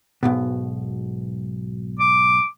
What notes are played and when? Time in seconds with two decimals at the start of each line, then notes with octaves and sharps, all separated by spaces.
0.23 B1 G#2 B2
1.99 D6